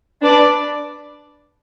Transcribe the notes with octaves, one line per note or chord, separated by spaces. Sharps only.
D4 B4 D5